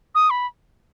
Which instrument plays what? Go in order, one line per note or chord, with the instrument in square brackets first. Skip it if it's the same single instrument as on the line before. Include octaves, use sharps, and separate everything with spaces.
[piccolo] D#6
B5